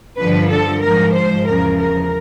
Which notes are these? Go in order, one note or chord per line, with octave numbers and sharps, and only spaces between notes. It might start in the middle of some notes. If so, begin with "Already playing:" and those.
G2 D3 F3 B4
A4
G#2 F3 A#4
C5
E2 C#3 F3 A#4
A#4